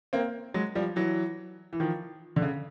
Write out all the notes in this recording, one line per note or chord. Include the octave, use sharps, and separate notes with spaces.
A#3 C4
F#3 G#3
F3 G3
E3 F#3
E3
D#3 F3
D3
C#3